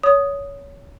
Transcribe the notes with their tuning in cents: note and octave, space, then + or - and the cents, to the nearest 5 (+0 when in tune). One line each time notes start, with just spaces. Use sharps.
C#5 +20 D#6 +0